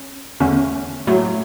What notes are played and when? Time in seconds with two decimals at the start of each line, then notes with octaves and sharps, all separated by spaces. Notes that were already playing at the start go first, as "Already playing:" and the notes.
Already playing: C#4
0.40 E2 D3 A3 C#4
1.07 A2 F#3 A3